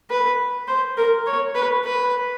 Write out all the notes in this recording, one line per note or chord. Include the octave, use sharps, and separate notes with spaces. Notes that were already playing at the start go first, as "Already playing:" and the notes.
B4
C5
A#4
C#5
B4
B4